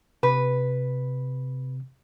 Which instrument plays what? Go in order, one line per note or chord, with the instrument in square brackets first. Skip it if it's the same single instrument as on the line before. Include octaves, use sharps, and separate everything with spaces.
[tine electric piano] C3 [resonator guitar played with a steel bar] B4